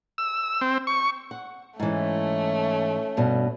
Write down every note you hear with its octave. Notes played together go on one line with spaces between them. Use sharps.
E6
C4
C#6
F#5
G#2 E3 A3 C#4
G2 B2